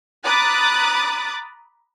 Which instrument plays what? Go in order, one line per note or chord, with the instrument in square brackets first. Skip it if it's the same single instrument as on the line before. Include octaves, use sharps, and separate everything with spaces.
[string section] A#5 B5 D6 D#6 F#6 A6